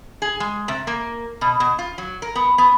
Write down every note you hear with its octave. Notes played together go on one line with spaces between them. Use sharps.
G#4
G#3
C3
A#3
B2
B2
F4
F#3
A#4
B3
B3